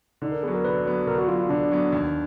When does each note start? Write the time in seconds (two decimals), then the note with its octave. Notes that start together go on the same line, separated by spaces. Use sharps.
0.22 D3 D#4
0.32 A#4
0.43 F#3 B3 G#4
0.54 A#4
0.65 D3 B4
0.85 F#3 B3
1.07 D3 A#4
1.18 F#4
1.28 F#3 B3 F4
1.40 F4
1.49 D3 D4
1.71 F#3 B3
1.93 D#2